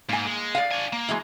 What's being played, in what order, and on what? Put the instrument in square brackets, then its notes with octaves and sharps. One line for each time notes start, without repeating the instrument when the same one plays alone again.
[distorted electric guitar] G#2 [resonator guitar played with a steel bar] A#3 G#5
[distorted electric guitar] G#3
[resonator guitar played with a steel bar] D5 F5
[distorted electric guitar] D4 G#5
A#3
[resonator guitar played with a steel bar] E3 F#3 G#3